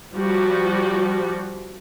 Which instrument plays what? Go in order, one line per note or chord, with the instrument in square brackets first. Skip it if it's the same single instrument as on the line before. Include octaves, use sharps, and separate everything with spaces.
[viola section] F3 G3 F#4